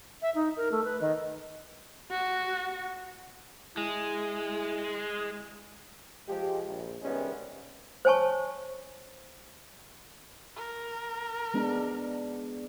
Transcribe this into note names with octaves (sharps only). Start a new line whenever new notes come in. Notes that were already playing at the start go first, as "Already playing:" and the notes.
E5
D#4
A#4
A3
B4
D#3
F#4
G#3 E4
F3 G#3 G4
A#1
C3 D#3 G3 G#3 B3 C#4
C5 C#5 G#5 A5 C#6
A#4
G#3 B3 D4